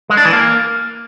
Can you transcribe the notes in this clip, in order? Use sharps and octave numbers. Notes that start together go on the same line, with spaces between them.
G#3
D4
E3
A#3